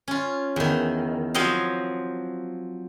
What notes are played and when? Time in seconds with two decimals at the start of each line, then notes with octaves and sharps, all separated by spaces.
0.08 C#4 F4
0.56 E2 D#3
1.34 F3 F#3 C4 D#5 F5